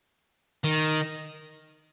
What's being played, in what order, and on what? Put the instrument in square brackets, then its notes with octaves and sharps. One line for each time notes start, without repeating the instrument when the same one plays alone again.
[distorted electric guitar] D#3